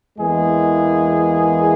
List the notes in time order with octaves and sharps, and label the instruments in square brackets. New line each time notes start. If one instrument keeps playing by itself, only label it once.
[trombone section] E2 E3 G#3 A#3 G#4